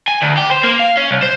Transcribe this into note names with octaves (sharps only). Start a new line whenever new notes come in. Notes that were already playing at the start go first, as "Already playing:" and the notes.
G#5
D2
G4
C5
A#3
F5
C#4
C2
C5